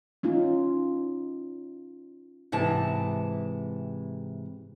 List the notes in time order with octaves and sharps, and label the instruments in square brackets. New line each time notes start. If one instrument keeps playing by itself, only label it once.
[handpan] C#4 D#4 F4
[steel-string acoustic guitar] G#2 C3 E3 A5